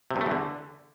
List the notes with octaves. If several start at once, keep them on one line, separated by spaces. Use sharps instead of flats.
C3
G2
A3
E2
D3